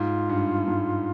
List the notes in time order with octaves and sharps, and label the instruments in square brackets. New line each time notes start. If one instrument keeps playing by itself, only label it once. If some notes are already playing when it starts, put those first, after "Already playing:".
Already playing: [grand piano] G#2 [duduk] F4
[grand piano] G2
G#2